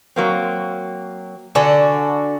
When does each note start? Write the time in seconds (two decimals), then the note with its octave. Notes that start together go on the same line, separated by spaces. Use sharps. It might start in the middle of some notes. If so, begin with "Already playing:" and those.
0.16 F#3 A#3 C4
1.55 D3 F#4 A4 G#5